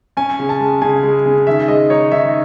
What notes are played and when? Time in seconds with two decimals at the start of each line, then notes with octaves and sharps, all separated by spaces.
0.17 C#4 G#5
0.39 C#3
0.49 A5
0.60 G#3
0.82 C#3 G#5
1.03 G#3
1.26 C#3
1.47 D#3 E5
1.68 G#3 D#5
1.90 D#4 C#5
2.12 D#3 E5